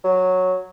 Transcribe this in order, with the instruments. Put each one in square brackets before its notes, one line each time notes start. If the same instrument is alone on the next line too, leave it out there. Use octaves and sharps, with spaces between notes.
[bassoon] F#3